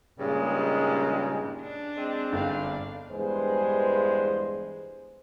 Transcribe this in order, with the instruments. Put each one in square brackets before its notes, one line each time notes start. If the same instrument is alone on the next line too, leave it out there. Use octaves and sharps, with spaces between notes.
[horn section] G2 A#2 C#3 G3 G#3 D#4
[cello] D4
[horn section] G#3 C4
[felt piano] G1 [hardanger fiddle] D5 F5
[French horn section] E2 G2 G#3 B4 C5